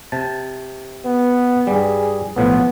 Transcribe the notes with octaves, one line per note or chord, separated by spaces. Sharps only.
C3 A5
B3
G2 G3 G#4
B1 A2 F3 B3